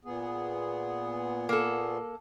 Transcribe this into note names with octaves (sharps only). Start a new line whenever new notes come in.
A#2 B3 G#4
A#3 A4